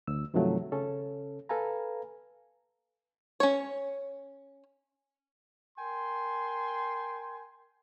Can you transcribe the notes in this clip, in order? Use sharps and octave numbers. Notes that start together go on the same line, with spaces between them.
D2 E6
G2 C3 D#3 F3 F#3 A3
C#3 C#4 A4
A4 B4 F5 G#5 A#5
C#4 C#5
A#4 G5 G#5 C6